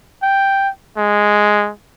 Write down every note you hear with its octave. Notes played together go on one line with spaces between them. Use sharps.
G5
G#3